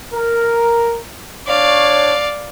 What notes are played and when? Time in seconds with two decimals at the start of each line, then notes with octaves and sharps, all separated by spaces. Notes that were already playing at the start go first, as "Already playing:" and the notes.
0.14 A#4
1.47 D4 C#5 D5 F5